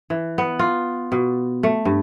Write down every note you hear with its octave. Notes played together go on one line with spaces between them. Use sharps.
E3
B3
F4
B2
A3
G2